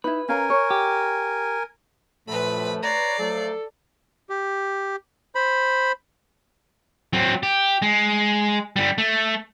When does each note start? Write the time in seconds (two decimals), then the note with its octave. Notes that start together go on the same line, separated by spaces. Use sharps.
0.04 D#4 E4 B4
0.29 C#4 A#4 F5 G#5 A#5
0.50 C#5
0.71 G4
2.28 F#2 A#2 F3 A3 B4 B5
2.82 B4 C#5 D5 A#5 C7
3.19 F3 F#3 A3 A4
4.30 G4
5.35 C5 B5
7.13 F#3 C4
7.43 G4
7.82 G#3
8.76 D3 G3
8.98 A3